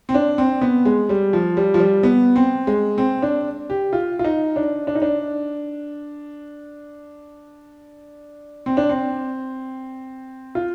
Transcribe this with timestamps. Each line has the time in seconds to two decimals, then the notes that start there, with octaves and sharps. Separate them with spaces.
0.09 C4
0.14 D4
0.38 C4
0.61 B3
0.85 G#3
1.09 G3
1.33 F3
1.57 G3
1.74 F3
1.79 G3
2.03 B3
2.36 C4
2.67 G#3
2.98 C4
3.22 D4
3.70 G4
3.93 F4
4.19 F4
4.25 D#4
4.56 D4
4.87 D4
4.95 D#4
5.02 D4
8.66 C4
8.77 D4
8.90 C4
10.55 F4